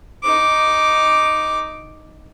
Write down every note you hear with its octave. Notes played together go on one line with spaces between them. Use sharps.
D#4 D6